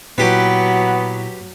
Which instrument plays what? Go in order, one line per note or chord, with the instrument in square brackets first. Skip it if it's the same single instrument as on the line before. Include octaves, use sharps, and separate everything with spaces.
[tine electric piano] A#2 E4 [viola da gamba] F#3 [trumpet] B3 [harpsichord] G4 B4